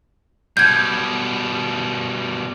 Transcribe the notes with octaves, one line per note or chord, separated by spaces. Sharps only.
B2 G3 G6 G#6